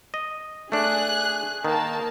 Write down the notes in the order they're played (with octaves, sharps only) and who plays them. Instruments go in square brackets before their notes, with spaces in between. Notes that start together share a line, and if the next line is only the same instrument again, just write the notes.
[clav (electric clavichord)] D#5
[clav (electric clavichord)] A3 D4 [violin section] G#4 F#6
[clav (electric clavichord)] D#3 [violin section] A#3 A5